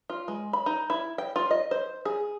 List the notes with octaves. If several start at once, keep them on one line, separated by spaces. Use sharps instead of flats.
F4
G#3
B5
D#4
E4
G5
F4
D#5
C5
G#4